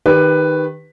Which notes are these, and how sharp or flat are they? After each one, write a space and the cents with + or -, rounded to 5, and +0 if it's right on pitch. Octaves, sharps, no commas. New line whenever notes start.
D#3 +0 G4 +20 B4 +5